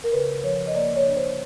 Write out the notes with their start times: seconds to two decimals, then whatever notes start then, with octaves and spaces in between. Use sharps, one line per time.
0.04 A#4
0.12 C#3 B4
0.43 F3 C#5
0.67 D#5
0.75 A#3 D5
0.96 C#5
1.06 D4
1.17 C5